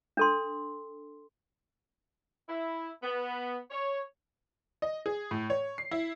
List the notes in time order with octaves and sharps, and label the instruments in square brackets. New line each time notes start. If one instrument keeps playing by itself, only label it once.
[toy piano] D4 A4 C6
[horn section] E4
B3
C#5
[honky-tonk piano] D#5
G#4
A2
C#5
C7
E4